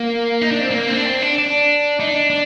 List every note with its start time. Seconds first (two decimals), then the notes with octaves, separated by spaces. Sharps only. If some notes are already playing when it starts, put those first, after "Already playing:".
Already playing: A#3
0.41 D#4
0.51 D4
0.61 C4
0.71 A#3
0.88 C4
0.97 D4
1.05 C4
1.22 D4
1.38 D4
2.00 D#4
2.07 D4
2.30 D4